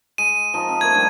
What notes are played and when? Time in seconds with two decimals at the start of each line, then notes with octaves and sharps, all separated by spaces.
0.18 G#3 D#7
0.54 F3 D#4 A#5
0.69 C4
0.81 A3 A#3 C5 G#6
0.94 D#3 G3 D4